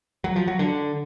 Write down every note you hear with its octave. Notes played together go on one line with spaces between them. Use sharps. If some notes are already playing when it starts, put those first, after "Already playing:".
F#3
F3
F#3
D3